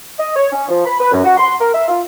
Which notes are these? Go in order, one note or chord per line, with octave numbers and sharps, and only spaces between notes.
D#5
C#5
C#4
F3
B5
B4
F#2
F#4
C6
A#4
E5
F4